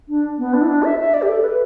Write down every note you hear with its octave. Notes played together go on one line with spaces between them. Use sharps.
D4
B3
D4
E4
D4
E5
E5
D5
G4
A4
B4